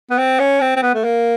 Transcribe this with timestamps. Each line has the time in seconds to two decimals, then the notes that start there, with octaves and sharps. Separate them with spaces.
0.10 B3
0.18 C4
0.39 C#4
0.61 C4
0.76 C4
0.82 B3
0.95 A3
1.04 A#3